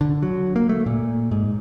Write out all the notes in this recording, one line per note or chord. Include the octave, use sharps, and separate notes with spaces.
D3
F#3
A#3
A3
A#2
G#2